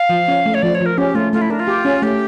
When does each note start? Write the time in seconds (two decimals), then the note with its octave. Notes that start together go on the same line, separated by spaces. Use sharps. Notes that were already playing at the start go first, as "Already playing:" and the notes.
Already playing: F5
0.09 F3
0.28 C#4
0.46 A3
0.54 C#5
0.62 F3 D5
0.75 C#5
0.81 F3
0.86 A#4
0.98 C#4 G4
1.15 A3 F4
1.33 A3 F4
1.42 E4
1.50 D4 A#4
1.60 F4
1.68 G4
1.85 C#4
2.02 A3 G4